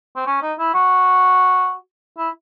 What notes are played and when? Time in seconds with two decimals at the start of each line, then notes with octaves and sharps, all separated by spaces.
0.16 C4
0.26 C#4
0.42 D#4
0.59 E4
0.74 F#4
2.18 E4